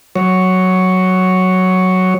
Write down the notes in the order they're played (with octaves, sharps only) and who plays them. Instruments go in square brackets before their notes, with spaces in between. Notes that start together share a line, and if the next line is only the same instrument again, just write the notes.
[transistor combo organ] F#3 C#5